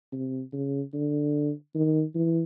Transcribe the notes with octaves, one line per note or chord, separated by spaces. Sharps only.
C3
C#3
D3
D#3
E3